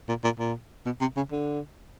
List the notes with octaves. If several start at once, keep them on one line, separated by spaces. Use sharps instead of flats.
A#2
A#2
A#2
B2
C3
C#3
D3